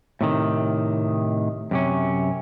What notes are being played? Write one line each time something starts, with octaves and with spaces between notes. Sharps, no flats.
A2 C3 D#3
F#2 C3 C#4